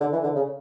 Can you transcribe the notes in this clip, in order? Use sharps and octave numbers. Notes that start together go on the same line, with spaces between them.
D3
E3
D3
C#3